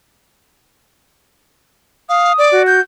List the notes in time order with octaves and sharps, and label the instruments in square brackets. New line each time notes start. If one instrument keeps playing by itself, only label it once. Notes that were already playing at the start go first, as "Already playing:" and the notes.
[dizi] F5 [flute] D#6
[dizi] D5
[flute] F#4
[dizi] G6